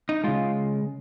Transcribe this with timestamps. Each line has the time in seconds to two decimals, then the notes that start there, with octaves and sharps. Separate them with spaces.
0.09 D#4
0.24 C#3 G#3 F4